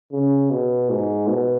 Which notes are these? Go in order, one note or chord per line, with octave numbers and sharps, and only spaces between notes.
C#3
B2
G#2
B2